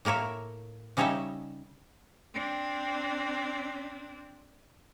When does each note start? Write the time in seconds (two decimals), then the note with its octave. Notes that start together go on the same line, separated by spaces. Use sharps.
0.05 A2 A#3 A#4 C#5 E5
0.97 C#3 G3 D#4 C#5 D#5 E5
2.34 C4 D4